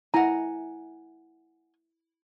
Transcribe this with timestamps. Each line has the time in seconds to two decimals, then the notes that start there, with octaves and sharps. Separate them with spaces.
0.14 E4 F#5 G#5 A#5